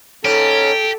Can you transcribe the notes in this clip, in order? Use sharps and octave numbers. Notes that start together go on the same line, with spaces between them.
G#2 C#3 C#4 G4 A4